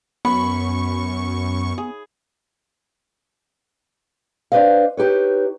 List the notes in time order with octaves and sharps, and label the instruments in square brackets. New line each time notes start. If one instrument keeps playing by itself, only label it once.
[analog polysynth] F#2 C#6 [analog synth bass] B3 [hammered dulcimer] B5
[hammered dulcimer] G#4
[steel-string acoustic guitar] D4 B4 C5 D#5 F5
D#4 G4 B4 C#5